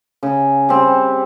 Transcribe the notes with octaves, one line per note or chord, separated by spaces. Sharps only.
C#3
G3 C4